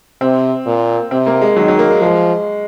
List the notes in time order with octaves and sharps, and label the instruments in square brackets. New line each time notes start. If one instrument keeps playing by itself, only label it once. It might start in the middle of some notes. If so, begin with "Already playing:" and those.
[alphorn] C3 [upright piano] C4
[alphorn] A#2
[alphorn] C3 [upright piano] C4
[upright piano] A#3
G#3
[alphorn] D#3 [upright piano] F#3
[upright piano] F#3
A#3
G#3
[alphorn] F3 [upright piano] G#3